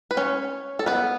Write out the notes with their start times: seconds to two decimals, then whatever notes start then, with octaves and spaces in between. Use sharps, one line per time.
0.11 B4
0.17 C#4 C#5
0.79 A4
0.86 B3 B4